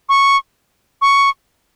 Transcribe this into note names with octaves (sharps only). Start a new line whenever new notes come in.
C#6
C#6